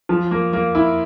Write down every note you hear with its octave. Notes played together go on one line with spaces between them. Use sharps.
F3
A#3
A#3
E4